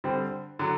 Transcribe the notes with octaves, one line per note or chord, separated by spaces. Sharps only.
D3 G3 C4
D3 F#3